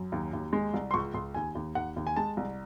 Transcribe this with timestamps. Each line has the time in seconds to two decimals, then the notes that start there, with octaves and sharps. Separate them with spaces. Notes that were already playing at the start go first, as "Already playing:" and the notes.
Already playing: F#2
0.12 D#2
0.33 D#2
0.53 G#3
0.74 C2
0.91 C6
0.94 C#2 C#6
1.14 C#2 C6
1.34 D#2 G#5
1.55 D#2
1.75 D#2 F#5
1.96 D#2
2.07 G#5
2.16 G#3 A5
2.37 C2